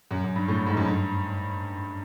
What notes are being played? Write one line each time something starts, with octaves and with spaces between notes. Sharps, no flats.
F#2
F#2
G2
A2
G#2
F#2
G2